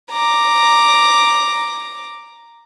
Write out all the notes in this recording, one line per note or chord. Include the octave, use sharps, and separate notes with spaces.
A#5 D6